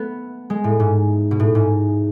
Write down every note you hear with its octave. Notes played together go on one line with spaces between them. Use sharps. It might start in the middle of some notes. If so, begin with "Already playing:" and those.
Already playing: A3 B3
G#3
A2
G#2
B2
A2
G#2